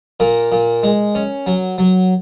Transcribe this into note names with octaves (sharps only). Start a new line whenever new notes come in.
A#2 A#4
A#2
G#3
C#4
F#3
F#3